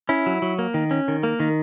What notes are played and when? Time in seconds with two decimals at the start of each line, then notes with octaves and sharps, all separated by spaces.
0.09 C#4 E4
0.26 F#3
0.42 F#3
0.59 A#3
0.74 D#3
0.91 C#4
1.08 D#3
1.23 A#3
1.40 D#3